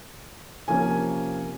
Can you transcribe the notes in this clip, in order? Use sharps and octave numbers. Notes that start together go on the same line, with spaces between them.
C3 F3 A#3 C#4 G#5